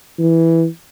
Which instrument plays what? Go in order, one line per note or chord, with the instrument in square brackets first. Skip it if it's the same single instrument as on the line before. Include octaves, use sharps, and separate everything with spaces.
[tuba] E3